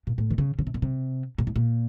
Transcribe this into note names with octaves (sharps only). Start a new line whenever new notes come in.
A#2
A2
D#3
C#3
C#3
C3
A#2
C3
A#2
A2
A#2